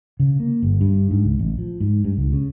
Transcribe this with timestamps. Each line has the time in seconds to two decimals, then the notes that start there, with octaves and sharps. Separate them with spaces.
0.20 C#3
0.40 A#3
0.63 G1
0.81 G2
1.11 G#2
1.24 C#2
1.39 A1
1.58 F3
1.80 G#2
2.04 G2
2.17 C#2
2.33 C#3